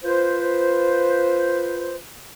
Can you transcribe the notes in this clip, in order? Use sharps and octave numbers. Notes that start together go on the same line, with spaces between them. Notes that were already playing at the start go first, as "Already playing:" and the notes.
F4 B4 C5